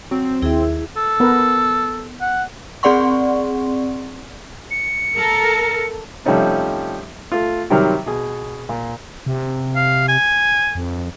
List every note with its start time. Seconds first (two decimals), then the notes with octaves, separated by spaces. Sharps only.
0.11 F#3 C4
0.42 D#2 E4 G#4 E5
0.96 A4
1.20 B3 A#4 B4
2.21 F#5
2.83 C4 G#4 D5 F#5 C6 C#6
4.71 C#7
5.17 A4 A#4
6.25 C3 F3 G3 A3 C#4 D#4
7.32 A3 F4
7.70 C3 D#3 F#3 G3 F6
8.06 B2 G#4
8.69 A#2
9.26 C3
9.76 F5
10.08 G#5
10.75 F2